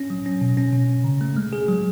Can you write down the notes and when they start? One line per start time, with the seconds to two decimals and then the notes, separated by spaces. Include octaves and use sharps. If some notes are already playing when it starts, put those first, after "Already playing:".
Already playing: C#4
0.10 F#3
0.26 C#4
0.41 B2
0.57 C#4
0.73 B2
0.89 C#4
1.04 C#3
1.21 A3
1.37 G#3
1.53 G#4
1.68 F#3